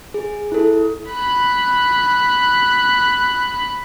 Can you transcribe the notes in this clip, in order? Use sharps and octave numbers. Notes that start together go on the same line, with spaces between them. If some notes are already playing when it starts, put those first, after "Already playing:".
G#4
E4 A4
B5 F#6